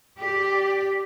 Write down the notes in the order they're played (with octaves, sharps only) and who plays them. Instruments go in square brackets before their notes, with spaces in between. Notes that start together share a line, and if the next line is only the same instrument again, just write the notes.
[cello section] G4 D5